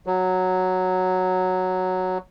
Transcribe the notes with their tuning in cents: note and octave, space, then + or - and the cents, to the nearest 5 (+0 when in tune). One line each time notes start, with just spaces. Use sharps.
F#3 +0